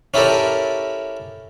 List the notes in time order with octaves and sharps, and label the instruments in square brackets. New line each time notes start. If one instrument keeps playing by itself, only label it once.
[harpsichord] C#4 E4 G4 A4 A#4 D5